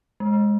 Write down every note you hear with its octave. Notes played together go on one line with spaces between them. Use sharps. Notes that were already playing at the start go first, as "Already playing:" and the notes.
G#3